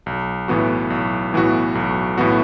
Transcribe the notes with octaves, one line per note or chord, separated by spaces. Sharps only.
B1
A2 E3 B3 F#4
B1
A2 E3 B3 F#4
B1
A2 E3 B3 F#4